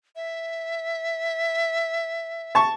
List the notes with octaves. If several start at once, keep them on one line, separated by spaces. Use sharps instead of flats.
E5
A5 C#6